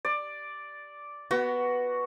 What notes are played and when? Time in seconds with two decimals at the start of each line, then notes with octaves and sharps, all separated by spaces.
0.05 D5
1.31 B3 F#4